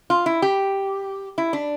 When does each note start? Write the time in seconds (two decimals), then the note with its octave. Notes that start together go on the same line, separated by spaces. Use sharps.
0.10 F4
0.26 E4
0.42 G4
1.38 E4
1.53 D4